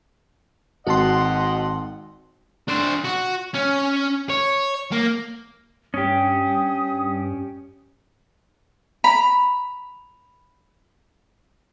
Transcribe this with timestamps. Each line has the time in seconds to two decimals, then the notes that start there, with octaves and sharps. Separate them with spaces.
0.87 G#1 F#4 D#5 F#5 A5 C6
2.68 D4 C5
3.05 F#4
3.54 C#4
4.30 C#5
4.92 A#3
5.94 G2 C#4 G4 D#6
9.04 A#5 B5